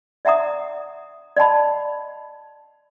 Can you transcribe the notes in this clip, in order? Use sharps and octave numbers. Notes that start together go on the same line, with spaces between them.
D5 E5 F#5 A#5 D#6
D5 D#5 F#5 A5 B5